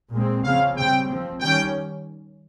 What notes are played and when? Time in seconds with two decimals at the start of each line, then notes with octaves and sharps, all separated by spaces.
0.12 A#2 G#3 C4
0.44 C#3 F3 C4 F5
0.76 C#3 G3 C4 G5
1.08 F3 C4
1.40 D#3 G3 C#4 G5